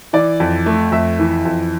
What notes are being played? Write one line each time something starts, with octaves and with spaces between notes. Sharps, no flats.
E3 D5
F2
A3
F2 E5
E3
F2